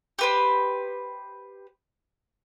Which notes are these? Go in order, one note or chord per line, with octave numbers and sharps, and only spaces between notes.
G4 B4 C5